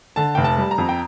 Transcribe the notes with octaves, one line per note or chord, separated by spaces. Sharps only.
D3 A5
F1 G5
A5
G3
A#5
F2
G5